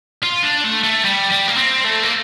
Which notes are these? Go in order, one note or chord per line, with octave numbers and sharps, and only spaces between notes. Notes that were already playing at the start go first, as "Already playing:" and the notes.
F4
D4
A3
A3
G3
G3
A#3
C4
A3
A#3